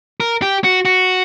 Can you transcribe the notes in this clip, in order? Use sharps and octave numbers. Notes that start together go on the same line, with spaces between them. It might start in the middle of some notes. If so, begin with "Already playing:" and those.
A#4
G4
F#4
F#4